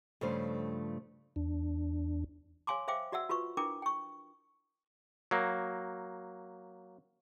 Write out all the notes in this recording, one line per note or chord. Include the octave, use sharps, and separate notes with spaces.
G2 C#3 F3 A3 C5
E2 D4
C#5 F5 G#5 C6 D6
C5 E5 F5 G5 D6
F#4 D5 E5 F#5 E6
F4 F#4 B4 C#6
D4 E4 A#4 B4 G5 D6
G5 C#6
F#3 A#3